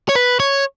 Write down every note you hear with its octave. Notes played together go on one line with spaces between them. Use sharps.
C#5
B4
C#5